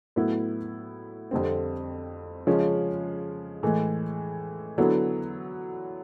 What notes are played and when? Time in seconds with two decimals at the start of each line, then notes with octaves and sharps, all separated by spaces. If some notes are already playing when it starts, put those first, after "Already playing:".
0.16 A2 F#3 B3 E4
1.31 F2 D3 G3 C4
2.47 C#3 F3 G#3 C#4
3.63 A2 E3 G#3
4.78 D3 F#3 B3 E4